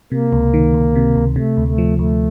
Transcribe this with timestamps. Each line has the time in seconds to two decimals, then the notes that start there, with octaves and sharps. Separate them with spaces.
0.12 C3 A#3
0.33 C#2
0.54 D#3
0.74 C#2
0.96 C3
1.16 C#2
1.36 C3 A3
1.57 D2
1.67 A3
1.78 F3
1.98 D2 A3